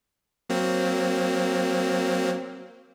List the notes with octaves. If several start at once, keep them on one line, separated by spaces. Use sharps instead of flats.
F#3 A#3 C4